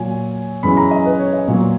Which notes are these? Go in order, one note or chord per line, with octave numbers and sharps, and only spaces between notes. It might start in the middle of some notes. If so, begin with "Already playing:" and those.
Already playing: A#2 F#3 G#5
F#2 E3 G#3 B5
A#5
D#5
B4
C#5
D#5
A#2 F#3 C#5